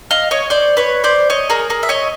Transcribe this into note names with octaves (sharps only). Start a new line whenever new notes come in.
D#5 F5
C#5 D#5
C5 D5
B4 C#5
C5 D5
C#5 D#5
G#4 A#4
G#4 A#4
E5
C#5 D#5